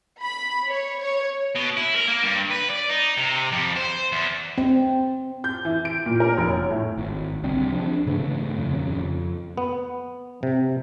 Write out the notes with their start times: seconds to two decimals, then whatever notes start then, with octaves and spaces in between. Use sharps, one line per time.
0.22 B5
0.69 C#5
1.02 C#5
1.55 B2
1.77 E4
1.95 A#4
2.07 A#3
2.23 G2
2.50 B4
2.70 D5
2.89 D#4
3.17 C3
3.52 F2
3.76 C5
4.12 E2
4.58 C4
5.44 G6
5.65 E3
5.85 D7
6.06 A#2
6.20 A#4
6.38 F1
6.49 C#5
6.71 A2
6.98 G#1
7.43 C2 D3 G3 C4
7.72 F3 D4
8.06 G#2 C#3 E3 A3
8.57 D#1 F2 C#3
8.95 F2
9.57 B3
10.43 C3